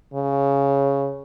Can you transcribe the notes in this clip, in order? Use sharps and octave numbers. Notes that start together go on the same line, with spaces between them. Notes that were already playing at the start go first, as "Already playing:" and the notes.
C#3